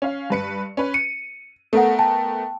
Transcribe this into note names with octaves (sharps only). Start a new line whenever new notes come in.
C#4 F5
G2 B4 C#7
C#4 B4
C#7 D#7
A3 B3 A4 A#4 F#5
G5 A5